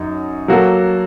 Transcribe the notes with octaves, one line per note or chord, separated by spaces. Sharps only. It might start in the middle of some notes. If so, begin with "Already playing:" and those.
Already playing: F#2 F#3 D#4
F#3 A#3 F#4 A4